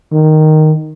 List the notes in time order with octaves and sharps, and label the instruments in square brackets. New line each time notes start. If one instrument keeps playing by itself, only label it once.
[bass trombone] D#3